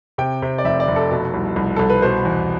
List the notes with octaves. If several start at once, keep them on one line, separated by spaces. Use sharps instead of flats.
C3 G5
C3
D5
F1 E5
D5
F1
A4
B2
C2
C2
C2 A4
B4
B2 C5
E2